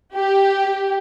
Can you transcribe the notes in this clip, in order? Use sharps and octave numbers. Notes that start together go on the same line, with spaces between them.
G4